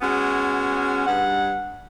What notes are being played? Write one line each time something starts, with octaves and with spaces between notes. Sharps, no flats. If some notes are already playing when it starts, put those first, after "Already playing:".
G#3 B3 C#4 F#4
G2 F#5